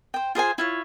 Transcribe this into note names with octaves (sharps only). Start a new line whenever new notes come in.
C5 G5
F4 G#4 C5 G#5
E4 F4 C#5